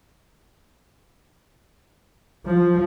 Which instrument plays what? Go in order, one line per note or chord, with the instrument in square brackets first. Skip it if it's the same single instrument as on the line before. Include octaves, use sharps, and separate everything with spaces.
[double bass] F3